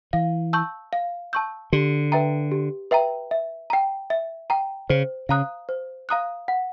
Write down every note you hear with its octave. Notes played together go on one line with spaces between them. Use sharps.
E3 F5
A5 C#6 E6 G6
F5
A5 C#6 E6 G6
D3 G4
B4 E5 G5 A#5
G4
B4 E5 G5 A#5
E5
G5 A#5
E5
G5 A#5
C#3 C5
C#3 F5 A#5 D#6 F#6
C5
F5 A#5 D#6 F#6
F#5